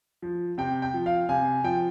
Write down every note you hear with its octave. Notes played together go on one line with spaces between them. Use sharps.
F3
C3 G5
G5
F3
F5
C3 G#5
F3 G5